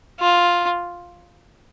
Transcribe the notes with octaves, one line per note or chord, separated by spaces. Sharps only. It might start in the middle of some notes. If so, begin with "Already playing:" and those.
F4